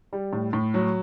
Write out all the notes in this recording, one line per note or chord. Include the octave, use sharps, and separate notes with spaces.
G3
A2
A2
F#3